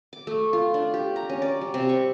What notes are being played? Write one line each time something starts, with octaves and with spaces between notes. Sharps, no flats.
D6
A3
F4
D4
G4
A#5
C#4
D5
G3
C3
C#6